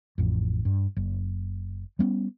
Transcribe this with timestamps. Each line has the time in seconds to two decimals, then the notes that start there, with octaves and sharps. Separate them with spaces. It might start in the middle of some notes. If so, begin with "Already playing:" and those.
0.18 A1 F2
0.65 G2
0.97 F#1
1.99 G3 B3 C#4